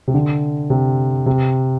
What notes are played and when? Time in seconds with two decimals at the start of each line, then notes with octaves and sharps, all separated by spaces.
0.08 C3
0.14 D3
0.70 C3
1.26 C3